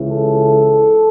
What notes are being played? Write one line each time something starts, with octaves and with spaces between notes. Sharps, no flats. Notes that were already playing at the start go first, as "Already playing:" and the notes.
Already playing: C#2 C#3 E3
A4